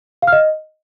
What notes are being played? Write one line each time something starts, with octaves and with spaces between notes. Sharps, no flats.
F5
F6
D#5